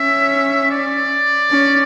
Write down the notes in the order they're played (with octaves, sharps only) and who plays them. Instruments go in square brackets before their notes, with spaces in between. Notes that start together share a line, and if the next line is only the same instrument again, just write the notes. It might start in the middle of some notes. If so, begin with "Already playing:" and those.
Already playing: [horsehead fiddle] C#4 [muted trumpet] E5
[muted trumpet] D5
[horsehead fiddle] C#4